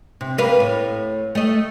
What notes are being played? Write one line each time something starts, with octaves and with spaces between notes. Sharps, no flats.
C3
A#3 B4 F5
A2
A3 D#5